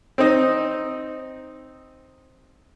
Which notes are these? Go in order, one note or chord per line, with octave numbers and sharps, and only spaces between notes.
C4 D#4